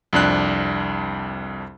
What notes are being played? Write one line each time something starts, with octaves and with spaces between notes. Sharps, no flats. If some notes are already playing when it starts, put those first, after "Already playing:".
C2 F2 D4 F#6